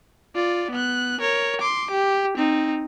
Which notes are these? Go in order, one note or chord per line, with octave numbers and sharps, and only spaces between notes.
F4 D5
B3 F#6
A#4 C#5
C6 D6
G4
C4 D#4